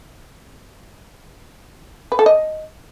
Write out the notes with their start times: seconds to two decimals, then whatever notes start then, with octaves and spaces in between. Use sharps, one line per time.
2.12 B4
2.19 A4
2.26 D#5